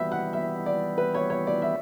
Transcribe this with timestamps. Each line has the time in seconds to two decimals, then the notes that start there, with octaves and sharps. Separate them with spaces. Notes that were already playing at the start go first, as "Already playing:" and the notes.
Already playing: E3 G3 B3 E5
0.12 F#5
0.33 E5
0.66 D5
0.98 B4
1.15 C#5
1.30 C#5
1.47 D5
1.62 E5